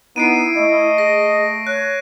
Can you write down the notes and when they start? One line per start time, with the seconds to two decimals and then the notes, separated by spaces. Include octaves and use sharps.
0.16 B3 D#4 E4 C7 D7 D#7
0.56 A3 D#5
0.98 G#4 A#6
1.67 C#5 F#6